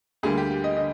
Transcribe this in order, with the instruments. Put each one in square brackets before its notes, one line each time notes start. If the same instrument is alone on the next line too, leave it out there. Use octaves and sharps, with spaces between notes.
[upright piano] D2 D3 G3 A#3 G#4
G4
G4
D#5
D3 D#5